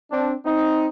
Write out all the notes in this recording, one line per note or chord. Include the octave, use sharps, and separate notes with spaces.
C4 D4
C4 D#4